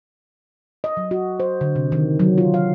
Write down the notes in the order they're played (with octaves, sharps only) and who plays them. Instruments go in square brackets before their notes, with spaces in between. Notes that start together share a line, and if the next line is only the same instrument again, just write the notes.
[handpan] D#5
F#3
F#4
C5
D3
C3
D#3
F#3
F4
F5